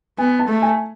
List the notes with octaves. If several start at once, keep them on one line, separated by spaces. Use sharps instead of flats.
B3 G#5
A5
A3
G#5